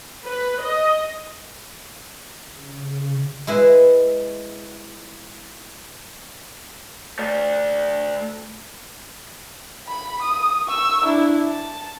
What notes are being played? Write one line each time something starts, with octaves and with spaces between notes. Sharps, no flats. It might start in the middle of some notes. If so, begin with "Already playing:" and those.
B4
D#5
C#3
G#3 E4 B4 D#5
A3 D5
B5
D#6
C#6 E6
D4 E4
A5